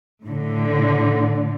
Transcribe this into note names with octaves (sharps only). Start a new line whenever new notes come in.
A2 D3